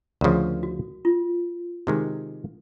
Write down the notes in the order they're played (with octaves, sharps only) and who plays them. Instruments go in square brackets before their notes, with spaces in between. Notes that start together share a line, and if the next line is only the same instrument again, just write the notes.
[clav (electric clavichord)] D2 C#3 F3 [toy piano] A#4
[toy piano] F#4
F4
[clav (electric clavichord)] C3 D#3 G#3